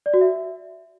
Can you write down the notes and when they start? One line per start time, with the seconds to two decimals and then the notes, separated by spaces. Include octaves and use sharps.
0.06 D5
0.14 F#4
0.21 E5